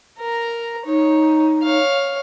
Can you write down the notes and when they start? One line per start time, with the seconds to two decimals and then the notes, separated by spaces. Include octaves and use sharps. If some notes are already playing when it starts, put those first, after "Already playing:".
0.18 A#4 A#5
0.86 D#4 C#5
1.63 C#5 F5